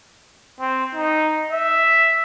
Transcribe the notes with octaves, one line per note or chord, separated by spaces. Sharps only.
C4
D#4
E5